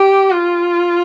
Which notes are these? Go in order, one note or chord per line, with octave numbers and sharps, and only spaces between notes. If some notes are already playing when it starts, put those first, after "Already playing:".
Already playing: G4
F4